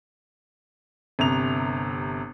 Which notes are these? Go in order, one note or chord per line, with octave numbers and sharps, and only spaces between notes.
G1 C3 A#5 F7